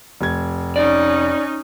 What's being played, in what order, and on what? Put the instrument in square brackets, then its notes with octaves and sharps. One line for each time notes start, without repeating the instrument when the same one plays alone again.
[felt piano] F1 G#6
[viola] C#4 D#4 [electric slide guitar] D5